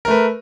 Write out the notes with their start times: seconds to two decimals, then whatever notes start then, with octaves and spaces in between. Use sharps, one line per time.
0.05 A#4
0.08 A3
0.11 B4